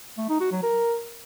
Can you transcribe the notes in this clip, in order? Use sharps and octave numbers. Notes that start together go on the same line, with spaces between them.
A3
D#4
F#4
F#3
A#4